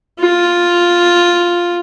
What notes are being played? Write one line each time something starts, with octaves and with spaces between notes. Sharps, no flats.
F4